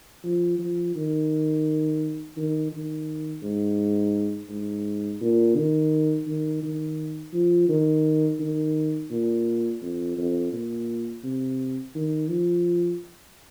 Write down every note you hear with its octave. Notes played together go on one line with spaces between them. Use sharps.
F3
F3
D#3
D#3
D#3
G#2
G#2
A#2
D#3
D#3
D#3
F3
D#3
D#3
A#2
F2
F2
A#2
C3
D#3
F3